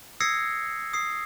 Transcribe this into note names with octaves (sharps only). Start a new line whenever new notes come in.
D#6 E6 G#6 A#6 C7 C#7
D#6 C7